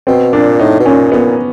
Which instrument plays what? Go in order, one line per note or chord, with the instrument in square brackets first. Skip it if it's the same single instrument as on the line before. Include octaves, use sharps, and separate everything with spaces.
[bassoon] B2 [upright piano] C4
[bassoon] A#2 [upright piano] D4
[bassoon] A2 [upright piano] D#4
[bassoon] B2
[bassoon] A#2 [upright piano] C#4
[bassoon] A#2 [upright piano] B3